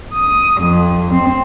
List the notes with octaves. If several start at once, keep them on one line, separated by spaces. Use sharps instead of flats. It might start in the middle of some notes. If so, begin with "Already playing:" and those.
D#6
F2
C4